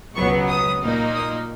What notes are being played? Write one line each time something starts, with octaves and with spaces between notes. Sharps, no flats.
C#2 B2 F#3 B3 C#6
D#6
A#2 A#3 D#4
D#6